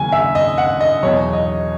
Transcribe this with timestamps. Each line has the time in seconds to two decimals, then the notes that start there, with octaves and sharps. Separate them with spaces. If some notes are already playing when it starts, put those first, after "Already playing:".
Already playing: D#2 C#3 F#3 G#5
0.12 E5
0.35 D#5
0.58 F#5
0.81 D#5
1.03 E2 B2 F#3 C#5
1.33 D#5